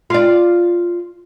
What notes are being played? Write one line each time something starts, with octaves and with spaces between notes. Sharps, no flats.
F4 D5